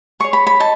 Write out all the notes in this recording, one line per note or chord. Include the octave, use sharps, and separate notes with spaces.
G#4 C#5 C#6
B5
B5
D#4 A5